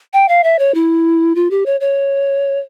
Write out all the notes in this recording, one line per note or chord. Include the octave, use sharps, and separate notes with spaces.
G5
F5
E5
C#5
E4
F4
G4
C#5
C#5